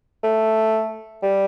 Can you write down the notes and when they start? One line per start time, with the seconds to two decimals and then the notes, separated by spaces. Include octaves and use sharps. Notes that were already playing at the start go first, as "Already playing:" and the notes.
0.23 A3
1.22 G3